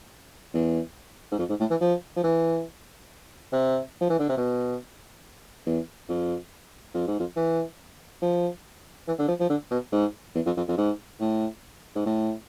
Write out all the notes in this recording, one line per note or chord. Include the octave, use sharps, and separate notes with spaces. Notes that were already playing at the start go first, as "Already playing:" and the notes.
E2
G#2
F2
G#2
A2
E3
F3
F3
E3
C3
F3
E3
D3
C3
B2
E2
F2
F2
G#2
F2
E3
F3
E3
D3
F3
F3
D3
B2
G#2
E2
F2
F2
F2
G#2
A2
G#2
A2